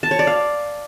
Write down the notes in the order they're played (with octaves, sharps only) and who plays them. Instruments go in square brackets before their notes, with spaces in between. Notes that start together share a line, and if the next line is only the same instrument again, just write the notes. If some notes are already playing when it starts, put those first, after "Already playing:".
[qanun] A5
C#5
D5
F5